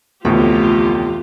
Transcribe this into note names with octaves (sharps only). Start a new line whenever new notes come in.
F1 D2 A2 E3 A3 B3 F4 G4